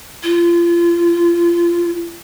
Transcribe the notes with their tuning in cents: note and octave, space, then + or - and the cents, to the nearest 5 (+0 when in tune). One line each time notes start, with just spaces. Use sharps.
F4 -30